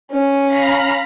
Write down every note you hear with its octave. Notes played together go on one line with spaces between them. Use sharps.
C#4
F5 A#5 B5